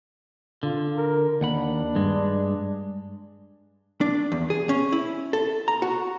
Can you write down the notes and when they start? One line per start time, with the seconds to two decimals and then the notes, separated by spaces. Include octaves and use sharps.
0.63 D3 F4
0.96 A#4
1.41 D#2 D4 F#5 B5
1.95 G2 G#3
4.01 D4
4.32 E2
4.50 G#4
4.69 C#4
4.92 E4
5.33 A4
5.68 A#5
5.82 F#4